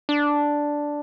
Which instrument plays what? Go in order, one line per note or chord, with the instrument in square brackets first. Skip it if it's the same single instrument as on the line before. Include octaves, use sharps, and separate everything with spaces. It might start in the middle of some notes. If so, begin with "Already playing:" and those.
[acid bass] D4